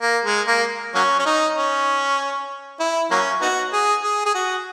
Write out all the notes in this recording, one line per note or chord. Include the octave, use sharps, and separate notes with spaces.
A#3
G#3
A#3
F#3 A#3 C#4
C#4
D#4
C#4
E4
F#3 A#3 C#4
B3 D#4 F#4
G#4
G#4
G#4
F#4